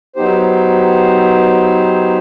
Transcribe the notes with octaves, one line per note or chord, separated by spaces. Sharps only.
F#3 B3 D#4 G4 C5